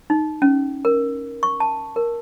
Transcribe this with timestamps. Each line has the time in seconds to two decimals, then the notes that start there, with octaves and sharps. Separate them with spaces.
0.10 D#4
0.42 C#4
0.85 A#4
1.43 C#6
1.60 A5
1.96 A#4